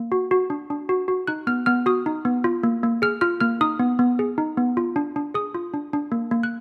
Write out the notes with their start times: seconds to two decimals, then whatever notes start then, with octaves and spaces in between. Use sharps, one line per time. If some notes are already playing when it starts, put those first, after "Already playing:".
Already playing: A#3
0.12 F#4
0.31 F#4
0.50 D4
0.70 D4
0.89 F#4
1.08 F#4
1.27 D#4 F#6
1.47 B3 F6
1.66 B3 F6
1.86 F#4 D#6
2.06 D#4
2.25 B3
2.44 F4
2.63 A#3
2.83 A#3
3.02 G#4 F6
3.21 F4 F6
3.40 A#3 F6
3.61 D#4 D#6
3.79 B3
3.99 B3
4.19 G#4
4.38 D#4
4.57 B3
4.77 F4
4.96 D4
5.16 D4
5.34 G#4 D#6
5.54 F4
5.74 D4
5.93 D4
6.12 A#3
6.31 A#3
6.43 F#6